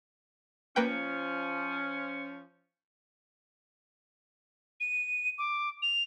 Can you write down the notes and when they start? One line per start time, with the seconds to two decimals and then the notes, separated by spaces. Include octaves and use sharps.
0.76 F3 A#3 C#4 B4 G5
4.80 D#7
5.38 D6
5.82 F7